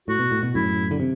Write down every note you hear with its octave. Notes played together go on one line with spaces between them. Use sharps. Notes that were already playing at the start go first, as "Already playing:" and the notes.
A2 F#4
B2
A2
B2
F#2 A2 E4
D3
C3